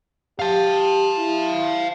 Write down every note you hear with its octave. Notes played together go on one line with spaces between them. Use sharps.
G4 F5 A5
E4